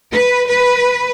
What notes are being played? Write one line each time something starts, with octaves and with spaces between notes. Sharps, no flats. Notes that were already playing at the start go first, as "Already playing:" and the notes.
B4
B4